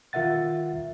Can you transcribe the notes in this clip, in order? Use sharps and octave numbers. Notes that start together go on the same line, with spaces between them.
D#3 F4 A#4 E5 F#5 A6